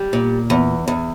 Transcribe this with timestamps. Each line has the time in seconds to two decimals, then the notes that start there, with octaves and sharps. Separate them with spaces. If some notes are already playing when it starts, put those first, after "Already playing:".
Already playing: G3
0.13 A#2
0.50 E2
0.88 E2